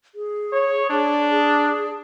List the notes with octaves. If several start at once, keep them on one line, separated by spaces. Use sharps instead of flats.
G#4
C#5
D4
G#4